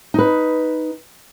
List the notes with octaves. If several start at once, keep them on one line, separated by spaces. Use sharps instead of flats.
D#4 B4